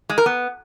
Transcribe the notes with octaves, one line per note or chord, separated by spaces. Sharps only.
G#3
A#4
B3